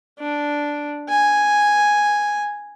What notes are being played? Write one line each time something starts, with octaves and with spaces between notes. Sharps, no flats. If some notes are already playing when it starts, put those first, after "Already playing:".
D4
G#5